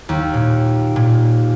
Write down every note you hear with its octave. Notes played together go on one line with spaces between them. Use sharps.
D#2
A#2
A#2